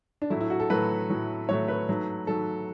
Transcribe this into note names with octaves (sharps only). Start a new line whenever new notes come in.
D4
A2 F#3 A3 E4
E4
F#4
A4
A2 F#3 A3 B4
A2 F#3 A3
A2 F#3 A3 C#5
B4
G#2 F#3 A3
G#2 F#3 A3 A4